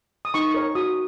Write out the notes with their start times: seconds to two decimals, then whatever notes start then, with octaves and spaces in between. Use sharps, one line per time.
0.25 D#6
0.34 D#4 C#6
0.54 A#4 C#5
0.75 F#4 D#6